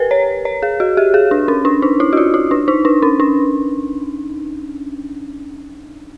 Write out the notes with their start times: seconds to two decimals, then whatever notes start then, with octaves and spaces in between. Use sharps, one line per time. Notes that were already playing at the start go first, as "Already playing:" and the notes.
Already playing: G4 A#4 B4
0.11 C#5
0.45 C#5
0.63 G#4
0.80 F#4
0.97 G4
1.14 G#4
1.31 D4
1.48 C#4
1.65 D4
1.82 D#4
2.00 E4
2.13 F#4
2.17 F4
2.34 E4
2.51 D4
2.68 D#4
2.85 D4
3.02 C#4
3.20 D4